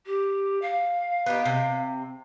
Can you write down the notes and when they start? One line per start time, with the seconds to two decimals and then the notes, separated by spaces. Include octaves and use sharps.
0.06 G4
0.62 F5
1.26 B3 D#4 G4
1.45 C3